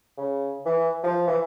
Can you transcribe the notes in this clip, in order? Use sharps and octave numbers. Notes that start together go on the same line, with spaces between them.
C#3
E3
F3
E3